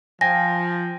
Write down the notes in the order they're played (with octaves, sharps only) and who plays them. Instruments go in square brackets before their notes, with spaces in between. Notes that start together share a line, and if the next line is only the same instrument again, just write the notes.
[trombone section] F3 [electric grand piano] G5 G#5 [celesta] A#6